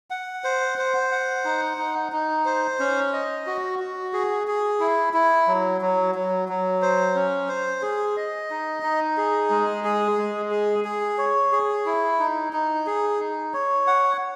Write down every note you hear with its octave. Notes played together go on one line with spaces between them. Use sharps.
F#5
C5
C5
F#5
D#4
D#4
D#4
C5
C#4
D#5
F#4
F#4
G#4
G#4
E4
E4
F#3
F#3
F#3
F#3
C5
C#4
C5
G#4
D#5
D#4
D#4
G#4
G#3
G#4
G#3
G#4
G#4
C#5
G#4
E4
D#4
D#4
G#4
D#4
C#5
F#5